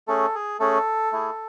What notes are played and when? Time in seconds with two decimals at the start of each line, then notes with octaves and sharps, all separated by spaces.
0.08 A3 C#4 G#4 A4
0.35 G#4
0.60 A3 C#4 G#4 A4
1.12 A3 E4 G#4